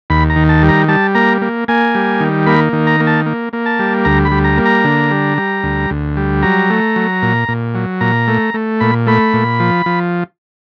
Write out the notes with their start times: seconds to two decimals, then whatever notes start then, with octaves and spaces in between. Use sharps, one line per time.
0.10 D#2 B5
0.30 A#5
0.36 D#3
0.49 A5
0.62 G3
0.69 A#5
0.88 G3 A5
1.15 A#3 A#5
1.42 A#3
1.68 A#3 G#5
1.95 G3
2.20 D#3
2.46 A#3 B5
2.73 D#3
2.87 A#5
3.00 A#3
3.07 A5
3.26 A#3
3.53 A#3
3.66 A5
3.79 G3
4.05 D2 A#5
4.25 B5
4.31 G3
4.44 A#5
4.58 A#3
4.65 A#5
4.84 D3
5.11 G3
5.38 G3
5.63 D2
5.90 D2
6.17 G3
6.43 F#3 A#5
6.70 A3
6.96 F#3
7.22 A#2
7.48 A#2
7.75 F#3
8.01 A#2 A#5
8.28 A3
8.54 A3
8.80 A#2 B5
9.07 A3 B5
9.33 A#2
9.60 F3
9.86 F3